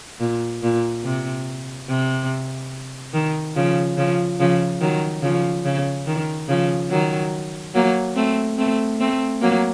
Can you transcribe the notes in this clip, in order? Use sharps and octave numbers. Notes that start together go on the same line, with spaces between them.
A#2
A#2
C3
C3
D#3
C#3 F3
C#3 F3
C#3 F3
D#3 F#3
C#3 F3
C#3
D#3
C#3 F3
D#3 F#3
F#3 A#3
A3 C4
A3 C4
A3 C4
F#3 A#3